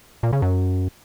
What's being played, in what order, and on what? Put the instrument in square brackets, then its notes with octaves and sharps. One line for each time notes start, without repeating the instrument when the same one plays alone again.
[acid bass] A#2
C#3
F#2